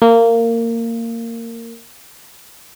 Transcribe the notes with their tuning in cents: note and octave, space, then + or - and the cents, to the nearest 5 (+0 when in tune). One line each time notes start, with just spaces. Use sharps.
A#3 -20